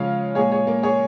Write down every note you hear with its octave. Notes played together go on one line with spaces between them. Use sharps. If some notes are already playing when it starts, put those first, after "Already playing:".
Already playing: C#3 F3 G#3 C#5 F5
A#2 G#3 G#4 C#5
G#4 C#5
A#3
G#4 C#5